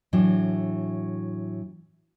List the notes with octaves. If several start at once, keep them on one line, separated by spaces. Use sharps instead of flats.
A2 E3 F#3 D4